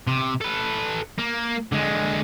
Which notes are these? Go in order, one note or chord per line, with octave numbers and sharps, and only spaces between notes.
C3
A4 B4
A#3
D3 G#3